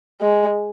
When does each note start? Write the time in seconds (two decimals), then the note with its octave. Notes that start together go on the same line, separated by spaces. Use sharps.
0.21 G#3